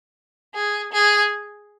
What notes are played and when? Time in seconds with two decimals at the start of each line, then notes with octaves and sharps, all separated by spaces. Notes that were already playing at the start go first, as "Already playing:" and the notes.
0.55 G#4
0.93 G#4